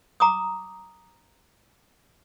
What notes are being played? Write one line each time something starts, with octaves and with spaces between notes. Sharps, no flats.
A#5 D6 D#6